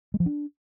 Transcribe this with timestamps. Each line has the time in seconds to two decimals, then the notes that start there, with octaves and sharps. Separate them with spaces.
0.14 G#3
0.20 F3
0.26 D4